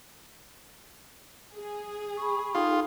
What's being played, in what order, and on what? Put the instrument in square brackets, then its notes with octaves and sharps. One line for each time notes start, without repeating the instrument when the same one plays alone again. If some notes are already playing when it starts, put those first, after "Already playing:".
[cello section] G#4
[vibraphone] B5 C#6
[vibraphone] D#4 A4 G5 [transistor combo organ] F4